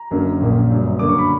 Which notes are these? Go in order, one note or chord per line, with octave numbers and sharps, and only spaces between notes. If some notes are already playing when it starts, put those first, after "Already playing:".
Already playing: A#5
F#1 F#2 D3 A#3 C#4
A#1 A#2 A#3 C#4
G1 F#2 C#3
F#2 D3 A#3 D6
C#6
B5